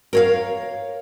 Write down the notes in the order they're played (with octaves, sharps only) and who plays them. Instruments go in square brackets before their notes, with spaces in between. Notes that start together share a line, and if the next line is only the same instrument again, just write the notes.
[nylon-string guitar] A#4 C#5 F5